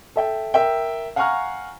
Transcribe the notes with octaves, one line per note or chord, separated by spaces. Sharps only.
A4 E5 G5
A#4 E5 G5
F5 F#5 G#5 A#5 C#6 F6